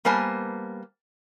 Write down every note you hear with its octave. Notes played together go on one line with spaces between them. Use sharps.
G3 A#3 B3 C5 G#5 A5